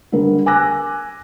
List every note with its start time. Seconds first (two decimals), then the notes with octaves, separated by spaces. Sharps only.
0.12 D3 G3 A#4
0.46 G#5 D6 E6 F#6 A#6